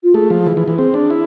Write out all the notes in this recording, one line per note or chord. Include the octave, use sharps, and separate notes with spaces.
F4
A3 G#4
F3
E3
E3
E3
C4 G#4
D4
E4